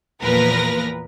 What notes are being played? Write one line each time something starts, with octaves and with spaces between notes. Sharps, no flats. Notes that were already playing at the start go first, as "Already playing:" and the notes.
E2 A#2 F3 A#4 B4 A#6